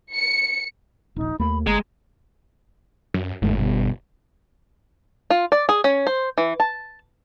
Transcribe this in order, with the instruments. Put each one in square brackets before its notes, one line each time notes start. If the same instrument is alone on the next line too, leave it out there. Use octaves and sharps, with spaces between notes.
[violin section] C#7
[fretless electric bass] D#1 A#1 [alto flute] D#4
[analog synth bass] D#2 [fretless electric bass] A3 A#3 [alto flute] B5
[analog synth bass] G1 [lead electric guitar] G#3 [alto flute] A#5
[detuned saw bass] F#2
[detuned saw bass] G1 [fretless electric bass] E2 G#2 A3
[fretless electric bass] B2 G3
[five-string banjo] F4
D5
G#4
C#4
C5
E3
A5